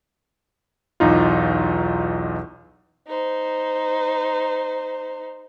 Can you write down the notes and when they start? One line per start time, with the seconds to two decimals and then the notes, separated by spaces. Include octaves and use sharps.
1.00 B1 E2 D#4 F4
3.08 D#4 C5